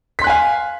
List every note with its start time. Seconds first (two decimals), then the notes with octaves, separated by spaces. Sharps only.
0.19 B6
0.21 C6
0.24 F#6
0.27 G#5
0.30 F5